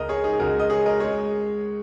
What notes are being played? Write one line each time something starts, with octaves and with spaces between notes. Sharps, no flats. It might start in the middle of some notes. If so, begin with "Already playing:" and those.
Already playing: C#2 C#3 G#3 A#4 D#5
G#4 C#5
D#4 G#4
C#2 C#3 G#3 F#4 A#4
D#5
G#4 C#5
A#4 D#5
G#3 G#4 C#5